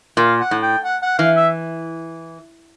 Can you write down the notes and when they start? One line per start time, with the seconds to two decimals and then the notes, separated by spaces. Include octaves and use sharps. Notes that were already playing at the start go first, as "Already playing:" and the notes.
0.17 A#2 F5
0.40 F#5
0.51 A2
0.63 G5
0.84 F#5
1.02 F#5
1.18 E3 F5
1.36 E5